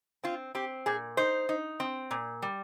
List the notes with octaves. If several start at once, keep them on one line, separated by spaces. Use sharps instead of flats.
C4 F4
C4 G4
A#2 G#4
D#4 C5
D#4
C4
A#2
G3